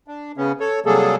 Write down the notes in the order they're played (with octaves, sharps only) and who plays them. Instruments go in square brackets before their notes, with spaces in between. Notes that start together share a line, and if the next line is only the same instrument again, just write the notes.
[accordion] D4
C#3 B3 C#4
A4 C#5
C3 F#3 G3 A#3 G#4 A4